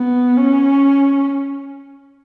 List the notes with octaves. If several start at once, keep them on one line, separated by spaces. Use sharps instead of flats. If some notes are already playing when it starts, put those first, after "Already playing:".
Already playing: B3
C#4